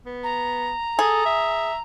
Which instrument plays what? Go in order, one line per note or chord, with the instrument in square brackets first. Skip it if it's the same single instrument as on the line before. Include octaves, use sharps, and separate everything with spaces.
[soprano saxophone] B3
[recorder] A#5
[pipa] G#4 [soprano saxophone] A4
[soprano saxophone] E5